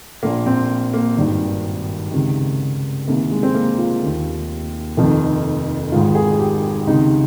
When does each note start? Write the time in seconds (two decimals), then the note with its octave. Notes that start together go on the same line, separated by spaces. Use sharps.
0.23 A#1 A#2 A#3
0.46 C4
0.94 A#3
1.17 G#1 G2 D#3
2.12 C#2 C3 D#3
3.07 C2 C3 D#3 A#3
3.31 G#3
3.43 C4
3.54 A#3
3.78 F4
4.02 D#2 D#3
4.97 F1 F2 D#3
5.92 G#1 G#2 D#3 F4
6.15 G#4
6.39 G4
6.87 C#2 C3 D#3 D#4